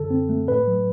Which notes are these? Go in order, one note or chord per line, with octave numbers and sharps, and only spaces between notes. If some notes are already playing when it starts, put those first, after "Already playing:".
Already playing: F#2 D3 A4
C4
A3
A2 B4
F#3